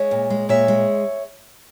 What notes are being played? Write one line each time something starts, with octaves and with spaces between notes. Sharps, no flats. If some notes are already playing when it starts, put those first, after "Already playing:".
Already playing: G#3 C#5 E5
A#2
G#3
A#2 C#5 E5
G#3